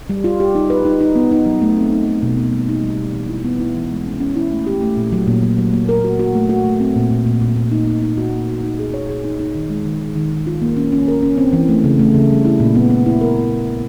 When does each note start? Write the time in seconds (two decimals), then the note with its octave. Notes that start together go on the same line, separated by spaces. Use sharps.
0.10 G3
0.24 F4
0.40 G4
0.55 D#4
0.70 B4
0.85 D#4
1.01 D#4
1.16 B3
1.31 D#4
1.46 F#3
1.62 A3
1.77 C4
1.92 D#4
2.08 A3
2.23 B2
2.38 A#3
2.53 G3
2.69 D#4
2.83 G3
2.99 B2
3.14 E3
3.29 E4
3.44 B3
3.60 E4
3.75 E3
3.90 G#3
4.06 C#4
4.20 C#4
4.36 E4
4.51 A3
4.67 G4
4.82 A3
4.97 A#2
5.12 F#3
5.28 A#2
5.43 F#3
5.58 F#3
5.74 A#3
5.89 A#4
6.04 F#4
6.19 F#4
6.35 A3
6.50 F#4
6.65 A3
6.80 C4
6.96 A#2
7.10 A#2
7.26 A#2
7.42 A#2
7.56 A#2
7.72 D#4
7.87 D#4
8.02 D#4
8.18 F#4
8.32 A#3
8.48 F#4
8.63 D#4
8.79 G#4
8.94 C#5
9.09 G#4
9.25 D#4
9.40 D#4
9.55 D#3
9.70 G#3
9.85 D#3
10.00 D#3
10.16 D#3
10.31 D#3
10.47 F4
10.62 A#3
10.77 C#4
10.92 C#4
11.08 A#4
11.23 C#4
11.38 C4
11.53 E3
11.69 A3
11.84 C#3
11.99 A3
12.14 C#3
12.30 G3
12.45 E4
12.60 A#2
12.75 B3
12.90 B3
13.06 E4
13.21 A#4